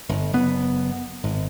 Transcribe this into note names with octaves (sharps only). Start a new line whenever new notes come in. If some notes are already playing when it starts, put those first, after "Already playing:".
G1
F#1 B3
G#1